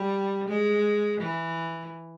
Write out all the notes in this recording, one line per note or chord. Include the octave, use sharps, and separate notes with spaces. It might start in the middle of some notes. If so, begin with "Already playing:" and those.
Already playing: G3
G#3
E3